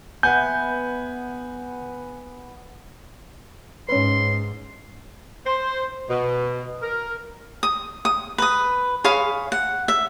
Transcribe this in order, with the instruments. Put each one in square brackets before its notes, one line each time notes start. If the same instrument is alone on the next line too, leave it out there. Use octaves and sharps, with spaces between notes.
[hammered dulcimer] B3 E5 [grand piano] B4 F#5 G#5 [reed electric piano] G6
[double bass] G#2 [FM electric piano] C#4 B4 [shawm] C6
[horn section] C5
B2
A#4
[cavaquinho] D#6
D#6
B4 D#6
G#4 C#5 F5 B5
F#5
E5